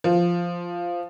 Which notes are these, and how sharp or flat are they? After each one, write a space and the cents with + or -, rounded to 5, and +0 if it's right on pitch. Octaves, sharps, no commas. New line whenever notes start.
F3 -5